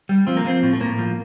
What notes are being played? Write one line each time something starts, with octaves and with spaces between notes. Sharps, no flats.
G3
F3 C4
A#3
F3 C4
A2
A3
A2 A#3
F3